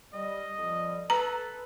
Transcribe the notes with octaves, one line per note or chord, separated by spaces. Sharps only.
G3 D#5
F2 F3 G3
A4 B4 A#5